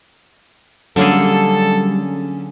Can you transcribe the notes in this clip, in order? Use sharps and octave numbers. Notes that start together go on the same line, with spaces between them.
D3 F#3 G3 A#3 C#4 G#4 A4